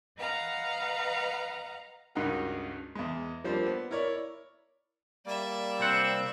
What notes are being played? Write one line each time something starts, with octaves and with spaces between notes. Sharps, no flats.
B4 D#5 F5 F#5 A#5
C#2 G2 C#3 D#4 F#4 A#4
E2 G#3
F3 G3 A#3 C4 D4 C5
B3
E4 A#4 C#5 D5
G3 A#3 D5 E5
C2 C4 F#5